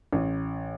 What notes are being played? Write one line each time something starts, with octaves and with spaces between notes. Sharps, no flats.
A1